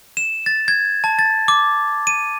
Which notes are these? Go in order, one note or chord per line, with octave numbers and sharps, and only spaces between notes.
E7
A6
G#6
A5
A6
D6
D#7